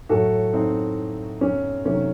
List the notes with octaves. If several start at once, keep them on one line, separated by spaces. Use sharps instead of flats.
A2 F#3 A3 F#4 A4
C4 D#4
C#4
C3 D#3 F#3 A3 C#4